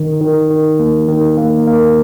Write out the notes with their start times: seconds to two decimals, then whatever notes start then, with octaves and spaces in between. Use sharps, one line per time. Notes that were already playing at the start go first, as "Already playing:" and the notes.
Already playing: D#3
0.21 D#3
0.50 D#3
0.80 A#3
1.09 D#3
1.37 A#3
1.67 A#3